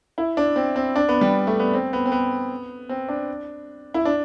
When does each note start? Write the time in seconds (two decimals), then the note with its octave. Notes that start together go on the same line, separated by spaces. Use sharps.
0.18 E4
0.37 D4
0.56 C4
0.76 C4
0.96 D4
1.08 B3
1.21 G3
1.47 A3
1.59 B3
1.73 C4
1.93 B3
2.06 C4
2.12 B3
2.89 C4
3.09 D4
3.94 E4
4.05 D4